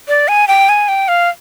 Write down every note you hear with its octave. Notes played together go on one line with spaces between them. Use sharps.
D5
G#5
G5
G#5
G5
F5